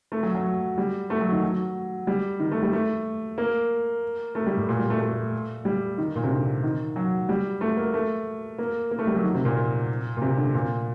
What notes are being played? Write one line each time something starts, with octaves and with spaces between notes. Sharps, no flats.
A3
F#3
F#3
G3
A3
F#3
D#3
F#3
G3
D#3
A3
G3
A3
A#3
A3
G3
A2
A#2
G3
A3
A3
G3
D#3
A#2
C3
D3
D#3
F#3
G3
A3
A#3
A3
A#3
A#3
A3
G3
F#3
D#3
C3
A#2
A#2
C3
D3
A#2